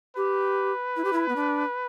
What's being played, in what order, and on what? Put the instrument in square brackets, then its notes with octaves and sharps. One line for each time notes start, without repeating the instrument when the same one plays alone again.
[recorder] G4 [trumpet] B4
[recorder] E4
G4
E4
B3
D4